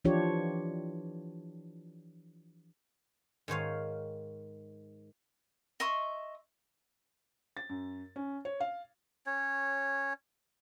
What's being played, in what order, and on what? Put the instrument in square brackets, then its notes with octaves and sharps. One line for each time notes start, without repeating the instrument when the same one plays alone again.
[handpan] E3 F3 D4 F4 G4 C#5
[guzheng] G#2 D#3 C#5 F5
[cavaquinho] D#5 E5 C6 C#6
[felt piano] A6
F#2
C#4
C#5
F5
[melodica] C#4 C#5